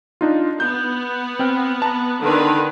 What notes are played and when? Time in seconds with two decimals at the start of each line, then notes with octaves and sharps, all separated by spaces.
0.21 D4 D#4 F4
0.60 B3 G6
1.39 C4 G5 F6
1.82 A5 A#5
2.20 D3 D#3 B4